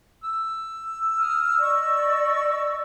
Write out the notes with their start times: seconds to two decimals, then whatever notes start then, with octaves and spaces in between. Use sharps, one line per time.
0.24 E6
1.16 D#6 F6
1.59 D5 D#5 C#6